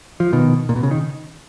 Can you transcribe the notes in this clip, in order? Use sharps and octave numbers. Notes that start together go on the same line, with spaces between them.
F3
B2 D#3
A#2
B2
C#3
D#3